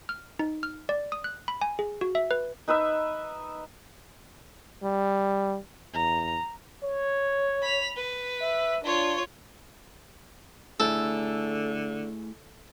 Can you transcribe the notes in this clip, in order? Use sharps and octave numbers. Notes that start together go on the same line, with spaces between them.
F6
D#4
F6
D5
D#6
F#6
B5
G#5
G#4
F#4
E5
B4
D#4 B4 D#5 E5
G3
E2 A#5
C#5
B5 F7
B4
E5
D4 F4 C#5
D3 A3 E4 G#4 A4